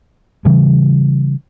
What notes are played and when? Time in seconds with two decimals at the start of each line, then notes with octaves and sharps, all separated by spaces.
0.45 C#3 E3 G3